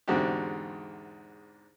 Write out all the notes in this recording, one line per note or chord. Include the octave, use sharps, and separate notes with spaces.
E2 G#2 D3 C4 F#4 G4